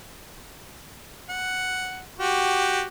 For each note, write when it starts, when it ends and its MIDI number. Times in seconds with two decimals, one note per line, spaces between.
1.29 2.03 78
2.20 2.85 66
2.20 2.85 67